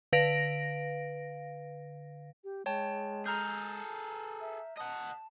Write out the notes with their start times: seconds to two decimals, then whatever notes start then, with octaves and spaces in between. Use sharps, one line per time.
0.13 D3 B4 F5 A#6 D7
2.44 G4
2.66 G#3 C#5 G5 A5
3.26 G#4 A4 A#5 F6 G6
4.41 E5
4.78 D#5 F#5 A5